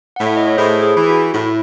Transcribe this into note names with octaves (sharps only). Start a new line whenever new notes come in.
A2 F#5
E5
D#5
C#5
A2 G#4 C5
G#4
E3
F#4
A2 E4